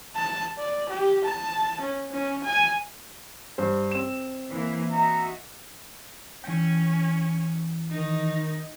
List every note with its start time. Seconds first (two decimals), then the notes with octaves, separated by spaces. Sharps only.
0.15 A5
0.58 D5
0.89 G4
1.25 A5
1.81 C#4
2.10 C#4
2.44 G#5
3.58 G2 C5
3.91 C4 E7
4.50 E3 A#3 E4
4.92 D#4 F#4 E5 A#5
6.44 E3 C#4 G5
7.91 D#3 D#4